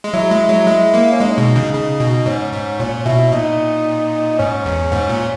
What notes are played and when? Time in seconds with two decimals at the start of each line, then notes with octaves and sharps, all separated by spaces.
0.04 G#3
0.14 F#3 E4
0.31 G#3
0.49 F#3
0.67 G#3
0.94 A#3
1.12 C#4
1.20 G#3 D#4
1.38 B2
1.56 C#3
1.73 C#3
2.00 B2
2.26 G#2 C#4
2.53 G#2
2.80 A#2 C#4
3.05 B2 E4
3.32 A#2 D#4
4.39 G#2 C#4
4.66 E2
4.92 G#2
5.09 A#2